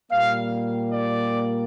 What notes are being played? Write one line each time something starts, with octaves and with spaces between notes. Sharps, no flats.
A#2 G3 A#3 F5
D5